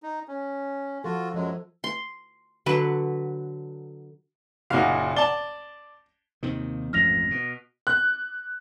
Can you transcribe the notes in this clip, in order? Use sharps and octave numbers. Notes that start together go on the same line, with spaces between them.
D#4
C#4
F3 F4 F#4 A4
F#2 F3 F#3 G#3
C6
D3 F#3 B4
F#1 A#2 D#4 F#4 F5
D5 A5 G7
D#2 C3 D#3
A1 F2 G#2 F6 A#6 F7
B2
F#6